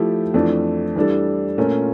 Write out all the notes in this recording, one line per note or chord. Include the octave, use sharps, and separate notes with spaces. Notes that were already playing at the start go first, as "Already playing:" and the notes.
Already playing: F3 A3 E4 G4
F2 E3 A3 D4
E3 G3 D4 A4
A#2 A3 C#4 F4 A#4